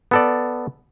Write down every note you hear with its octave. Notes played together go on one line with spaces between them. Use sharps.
B3 A4 D5